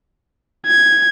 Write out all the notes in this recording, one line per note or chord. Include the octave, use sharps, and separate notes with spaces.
G#6